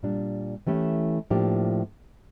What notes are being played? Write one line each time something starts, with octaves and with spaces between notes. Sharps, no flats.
A#2 G3 D4
E3 A3 C#4 E4 G4
A2 F3 A#3 D4 G4